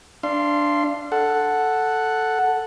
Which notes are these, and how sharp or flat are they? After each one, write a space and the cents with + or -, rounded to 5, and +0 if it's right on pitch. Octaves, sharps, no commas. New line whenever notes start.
D4 +0 F5 -30 C6 +0
A4 +0 F#5 +0